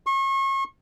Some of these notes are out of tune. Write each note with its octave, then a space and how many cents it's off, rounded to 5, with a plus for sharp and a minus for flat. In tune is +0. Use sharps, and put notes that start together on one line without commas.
C#6 -35